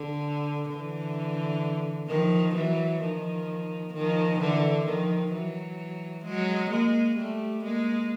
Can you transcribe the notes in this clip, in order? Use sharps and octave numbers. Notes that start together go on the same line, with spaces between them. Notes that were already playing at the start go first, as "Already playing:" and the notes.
Already playing: D3
D3 E3
D#3 F3
E3 F#3
D#3 F3
D#3 F3
D3 E3
D#3 F3
E3 F#3
F#3 G#3
G#3 A#3
G3 A3
G#3 A#3